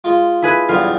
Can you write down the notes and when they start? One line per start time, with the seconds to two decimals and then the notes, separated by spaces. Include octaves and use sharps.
0.04 G#3 F4
0.42 E4 G#4 B4
0.69 B1 E2 G2 F4